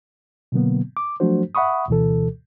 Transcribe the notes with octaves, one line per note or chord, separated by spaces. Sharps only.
B2 D3 F#3 A#3 B3
D6
F3 F#3 A3 D4 F#4 C5
E5 F#5 B5 C#6 D#6
D2 B2 E3 A4